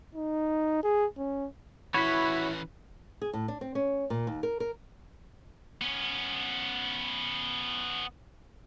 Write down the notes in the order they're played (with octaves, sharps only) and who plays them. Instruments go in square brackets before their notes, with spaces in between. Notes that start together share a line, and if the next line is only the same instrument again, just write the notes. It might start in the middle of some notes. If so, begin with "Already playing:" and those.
[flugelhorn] D#4
G#4
C#4
[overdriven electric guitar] E3 C#4 [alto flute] E4 [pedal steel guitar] F#4 C#5 [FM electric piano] B5 B6
[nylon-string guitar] G#4
A2
D4
C4
C#4
A#2
D#2
A#4
A#4
[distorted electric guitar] B3 C#4